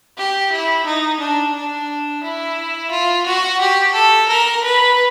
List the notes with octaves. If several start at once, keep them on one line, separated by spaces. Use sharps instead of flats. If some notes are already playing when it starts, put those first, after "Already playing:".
G4
E4
D#4
D4
D4
E4
F4
F#4
G4
A4
A#4
B4